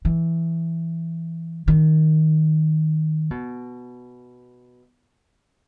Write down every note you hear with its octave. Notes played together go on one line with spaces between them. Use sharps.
E3
D#3
B2